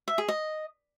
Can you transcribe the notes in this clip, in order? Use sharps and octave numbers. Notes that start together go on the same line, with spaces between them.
E5
G#4
D#5